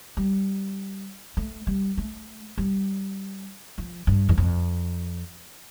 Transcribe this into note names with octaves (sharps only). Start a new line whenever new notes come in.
G3
A3
G3
A3
G3
F3
G2
E2
F2